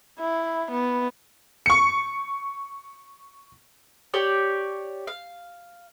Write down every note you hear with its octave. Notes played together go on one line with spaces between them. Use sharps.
E4
B3
C#6 C#7
G4 C#5 D5
F5